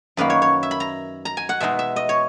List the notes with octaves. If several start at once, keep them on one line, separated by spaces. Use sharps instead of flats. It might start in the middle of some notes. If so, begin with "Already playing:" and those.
F#2 D#3 A#3 B4
C#5
C#5
E5
B5
A#5
A#5
G#5
F#5
B2 G#3 D#4 E5
E5
D#5
C#5